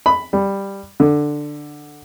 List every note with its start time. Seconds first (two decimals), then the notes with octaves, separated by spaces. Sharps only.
0.06 B5
0.33 G3
1.00 D3